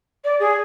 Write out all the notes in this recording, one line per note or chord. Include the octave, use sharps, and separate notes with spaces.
D5
G#4